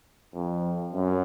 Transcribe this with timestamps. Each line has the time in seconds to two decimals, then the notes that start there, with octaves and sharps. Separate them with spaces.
0.34 F2
0.93 F#2